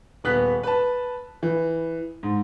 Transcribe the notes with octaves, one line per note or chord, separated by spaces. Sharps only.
D#1 B3 F#6 B6
B4 A5
E3
G#2